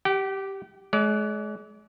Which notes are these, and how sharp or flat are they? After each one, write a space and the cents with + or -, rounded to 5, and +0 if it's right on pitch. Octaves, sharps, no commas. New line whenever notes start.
G4 -5 G5 -45
G#3 +35 D5 -35